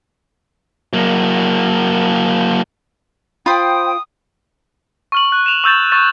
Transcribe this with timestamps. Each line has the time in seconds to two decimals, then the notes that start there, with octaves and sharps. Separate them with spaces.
0.93 F#3 A#3
3.46 F4 C5 G5 B5 D#6
5.12 C#6 F6 F#7
5.32 F#6
5.46 E7 F7
5.64 C#6 E6 G6 A6 E7
5.92 C#6 E6 A6